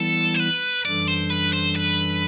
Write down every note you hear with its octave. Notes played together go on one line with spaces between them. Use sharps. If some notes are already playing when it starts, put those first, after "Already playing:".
Already playing: E3 G3 B3 E4 A4
C5
B4
F#2 E3 G3 D4 A4 D5
C5
B4
C5
B4